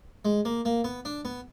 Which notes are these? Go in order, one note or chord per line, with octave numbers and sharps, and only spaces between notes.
G#3
A#3
A#3
B3
D4
B3